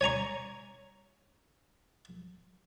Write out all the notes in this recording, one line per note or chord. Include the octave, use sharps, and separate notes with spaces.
C#5 G#5 A#5 C#6